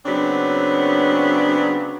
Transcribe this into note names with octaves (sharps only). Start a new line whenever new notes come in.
C#3 F#3 B3 C4 D4